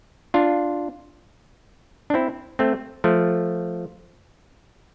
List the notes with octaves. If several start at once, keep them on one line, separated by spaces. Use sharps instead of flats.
D4 F4
D4
C4 E4
A3 C4
F3 A3